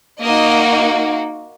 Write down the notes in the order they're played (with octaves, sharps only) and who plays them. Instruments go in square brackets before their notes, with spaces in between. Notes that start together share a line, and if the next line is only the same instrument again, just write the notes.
[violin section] A#3 D#4 F#4 D#5